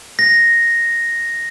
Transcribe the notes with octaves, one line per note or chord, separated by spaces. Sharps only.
A#6